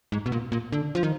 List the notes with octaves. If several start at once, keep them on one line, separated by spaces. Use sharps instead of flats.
G#2
B2
A#2
A#2
D3
F3
D#3